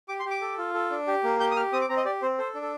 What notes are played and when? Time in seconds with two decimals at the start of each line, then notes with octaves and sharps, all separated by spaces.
0.09 G4 D6
0.20 C6
0.25 G4
0.31 D6
0.41 A4
0.58 F4
0.74 A4
0.91 D4
1.07 G4
1.24 A#3
1.40 G4 G6
1.51 D#6
1.56 G4 F6
1.73 C4 D#6
1.81 D6
1.89 C4 A#5
1.97 D#5
2.05 G4 D5
2.22 C4 C5
2.38 A4 C5
2.55 D4
2.62 A4